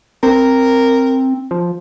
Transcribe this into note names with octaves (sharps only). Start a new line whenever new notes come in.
C4 A#4
F3